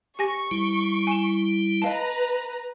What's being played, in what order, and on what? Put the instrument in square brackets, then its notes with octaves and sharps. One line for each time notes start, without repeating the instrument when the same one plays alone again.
[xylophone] G4 G#5 A#6 [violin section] C#6
[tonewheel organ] G3 E4
[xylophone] G#5 E7
[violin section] B4 A#5 [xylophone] D#5 F5 A5